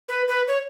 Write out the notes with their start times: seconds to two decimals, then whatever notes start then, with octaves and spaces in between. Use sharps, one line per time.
0.09 B4
0.28 B4
0.48 C#5